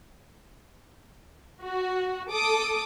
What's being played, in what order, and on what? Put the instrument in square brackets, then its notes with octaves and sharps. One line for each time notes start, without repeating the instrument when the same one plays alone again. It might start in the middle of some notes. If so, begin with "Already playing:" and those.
[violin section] F#4
A4 D6 D#6